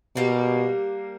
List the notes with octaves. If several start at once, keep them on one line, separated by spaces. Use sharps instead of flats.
B2 G3 A#3 D4